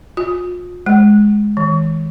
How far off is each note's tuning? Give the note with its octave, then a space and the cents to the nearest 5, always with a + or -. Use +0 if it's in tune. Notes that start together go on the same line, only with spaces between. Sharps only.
F4 +40
G#3 +5
E3 -45